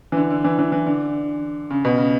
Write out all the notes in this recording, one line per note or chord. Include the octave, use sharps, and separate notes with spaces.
E3
D3
D3
E3
E3
E3
D3
C#3
B2
C#3